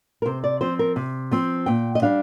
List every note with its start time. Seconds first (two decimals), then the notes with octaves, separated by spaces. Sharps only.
0.22 A#4
0.26 C3 C5
0.44 D5
0.61 F3 C4 C5
0.79 A#4
0.96 C3
1.31 F3 C4
1.66 A#2 G5
1.95 D#5
2.02 G3 D4 F5